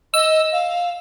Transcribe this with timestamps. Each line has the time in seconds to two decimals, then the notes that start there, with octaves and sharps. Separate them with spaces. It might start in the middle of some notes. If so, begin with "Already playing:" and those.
0.14 D#5 E6
0.52 F5